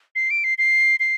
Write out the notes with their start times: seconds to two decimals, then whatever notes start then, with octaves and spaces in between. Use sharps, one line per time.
0.15 C7
0.30 D7
0.44 C7
0.58 C7
1.00 C7